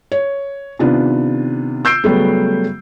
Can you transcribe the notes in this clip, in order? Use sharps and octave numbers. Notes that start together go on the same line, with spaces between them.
C#5
C3 D#3 B3 D4 F4
E6 G6 C7 D7
C#3 F#3 G3 A3 B3